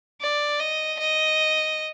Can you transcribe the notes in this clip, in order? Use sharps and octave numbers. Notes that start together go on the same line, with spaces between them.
D5
D#5
D#5